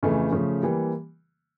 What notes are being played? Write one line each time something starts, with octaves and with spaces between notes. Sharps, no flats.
F2 C#3 E3 A3
C#3 F3 A3 C#4
E3 G3 A#3